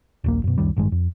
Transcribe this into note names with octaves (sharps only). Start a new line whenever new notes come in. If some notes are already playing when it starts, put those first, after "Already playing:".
D#1 A#1 A#3
F#2 B2
C#2 F#2 D#3 G3
A1 G2 D#3 G#3
F2